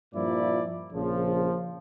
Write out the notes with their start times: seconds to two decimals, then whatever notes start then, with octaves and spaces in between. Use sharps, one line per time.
0.15 G2 A#2 F3 E4 D5
0.93 A#1 C#3 F3